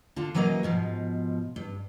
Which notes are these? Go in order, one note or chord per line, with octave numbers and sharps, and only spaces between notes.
D3 F4 A5
E3 F#3 A#3 A#4 D#5
G#2 B2 F3
G2